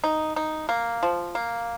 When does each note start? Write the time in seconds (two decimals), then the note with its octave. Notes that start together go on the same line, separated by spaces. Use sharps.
0.04 D#4
0.36 D#4
0.69 A#3
1.03 F3
1.35 A#3